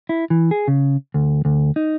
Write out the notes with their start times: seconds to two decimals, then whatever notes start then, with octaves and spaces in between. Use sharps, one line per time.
0.09 E4
0.30 E3
0.51 G#4
0.68 C#3
1.14 D2
1.45 D2
1.76 D#4